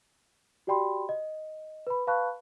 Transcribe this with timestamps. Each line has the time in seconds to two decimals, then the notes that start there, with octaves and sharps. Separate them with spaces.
0.67 F#4 G4 D5 G5 B5 C6
1.09 D#5
1.87 B4 B5
2.07 B4 F5 A5 B5 C#6 F#6